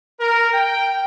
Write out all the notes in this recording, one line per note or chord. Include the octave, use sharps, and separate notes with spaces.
A#4
G5